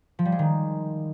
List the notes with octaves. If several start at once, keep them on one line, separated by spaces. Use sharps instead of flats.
F3
G3
G#3
D#3